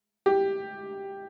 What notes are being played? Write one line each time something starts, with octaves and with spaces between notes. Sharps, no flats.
G4